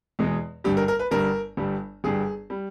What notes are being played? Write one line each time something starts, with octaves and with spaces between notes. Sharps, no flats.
E2 B2 G#3
G1 G2 G3 G4
A#4
A#4
B4
G1 G2 G3 A#4
G1 G2 G3
G1 G2 G3 G#4
G3